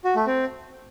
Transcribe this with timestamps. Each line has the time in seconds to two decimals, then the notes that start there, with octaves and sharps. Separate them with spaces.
0.04 F#4
0.15 A3
0.26 C4